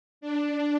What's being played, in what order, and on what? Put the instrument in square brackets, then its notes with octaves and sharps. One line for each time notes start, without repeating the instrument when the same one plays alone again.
[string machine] D4